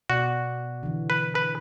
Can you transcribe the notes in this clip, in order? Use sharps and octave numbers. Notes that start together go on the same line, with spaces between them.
B2 F#4 D5
D3 E3
B4
B4